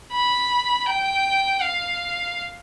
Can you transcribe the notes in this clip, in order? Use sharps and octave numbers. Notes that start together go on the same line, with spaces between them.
B5
G5
F5